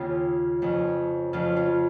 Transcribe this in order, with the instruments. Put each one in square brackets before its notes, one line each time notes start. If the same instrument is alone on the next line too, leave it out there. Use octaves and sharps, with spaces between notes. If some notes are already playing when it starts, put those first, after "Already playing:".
Already playing: [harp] D#2 C#3 D#4 F4
F2 C#3
F2 C#3 F4
F4